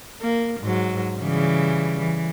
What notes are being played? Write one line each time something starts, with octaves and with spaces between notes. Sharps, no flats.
A#3
G#2 F#3
C#3 E3 G3
E3